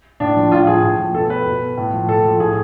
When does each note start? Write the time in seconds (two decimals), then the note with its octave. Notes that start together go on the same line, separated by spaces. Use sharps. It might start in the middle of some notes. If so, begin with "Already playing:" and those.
0.20 A2 D4
0.36 F3
0.52 A2 F4
0.67 F3 G#4
0.83 A2
0.99 F3
1.14 B2 A4
1.30 B4
1.46 B2
1.77 A2
1.93 F3
2.08 A2 A4
2.24 F3
2.40 A2 G#4